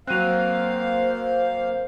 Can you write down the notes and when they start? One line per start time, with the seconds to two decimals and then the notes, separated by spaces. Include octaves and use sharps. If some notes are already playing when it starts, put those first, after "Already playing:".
0.07 F#3 A#3 C4 C5 F5 F#6 D#7 F7